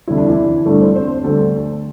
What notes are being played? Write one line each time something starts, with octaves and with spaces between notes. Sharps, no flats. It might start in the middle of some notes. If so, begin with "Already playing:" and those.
D2 C3 E3 G3 E4
D4
E3 E4
G1 G2 D3 G3 A3 A4
C4 C5
C4 C5
D2 D3 G3 A3 A4